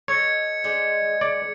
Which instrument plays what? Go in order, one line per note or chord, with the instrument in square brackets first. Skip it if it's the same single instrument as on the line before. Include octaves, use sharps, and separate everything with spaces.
[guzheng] A4 D#5 [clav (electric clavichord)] C#5 [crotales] G#6 C#7
[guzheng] G#3 D4 C5
[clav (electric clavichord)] D5